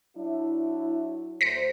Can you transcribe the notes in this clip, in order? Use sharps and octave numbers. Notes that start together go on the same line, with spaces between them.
F#3 D4 E4
D2 C5 A#6 B6 C#7